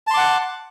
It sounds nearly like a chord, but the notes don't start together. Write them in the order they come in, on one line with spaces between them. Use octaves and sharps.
A5 C6 D6 F#5